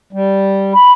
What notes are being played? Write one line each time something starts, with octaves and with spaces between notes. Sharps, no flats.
G3
B5